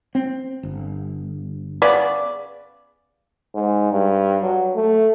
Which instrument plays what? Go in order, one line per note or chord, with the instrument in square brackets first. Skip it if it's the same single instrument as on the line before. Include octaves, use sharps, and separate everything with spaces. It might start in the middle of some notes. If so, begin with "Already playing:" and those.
[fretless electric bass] C4
G1
[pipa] C#3 B3 D5
[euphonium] G#2
G2
F#3
A3